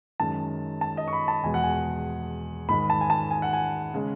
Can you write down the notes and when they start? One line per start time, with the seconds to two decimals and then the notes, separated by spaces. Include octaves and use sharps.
0.20 F#2 D#3 G#3 A5
0.81 A5
0.97 D#5
1.08 C#6
1.13 B5
1.28 A5
1.43 E2 B2 G#3 G#5
1.54 F#5
1.63 G#5
2.68 G#2 D#3 G#3 B5
2.90 A5
3.01 G#5
3.10 A5
3.31 G#5
3.42 F#5
3.53 G#5
3.94 C#3 G#3